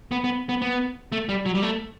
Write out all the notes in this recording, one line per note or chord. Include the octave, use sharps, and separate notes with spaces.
B3
B3
B3
B3
A3
G3
F#3
G3
A3